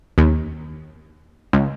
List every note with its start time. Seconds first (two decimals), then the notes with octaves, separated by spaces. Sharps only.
0.18 D#2
1.53 C#2